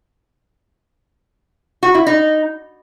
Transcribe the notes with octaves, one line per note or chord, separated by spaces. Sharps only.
F#4
E4
D#4